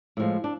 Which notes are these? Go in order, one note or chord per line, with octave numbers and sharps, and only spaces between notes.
A2 F3 G#3
D4